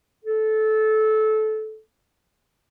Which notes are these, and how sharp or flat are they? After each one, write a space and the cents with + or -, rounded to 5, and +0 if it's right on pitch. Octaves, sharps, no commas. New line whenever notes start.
A4 -20